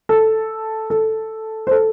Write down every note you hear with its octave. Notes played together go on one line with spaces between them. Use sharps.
A4
A4
C5
A4